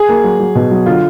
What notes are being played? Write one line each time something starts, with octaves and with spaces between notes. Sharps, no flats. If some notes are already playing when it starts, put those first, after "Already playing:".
Already playing: G#4
A#3
F#3
F#3
B2
F#3
D3 F4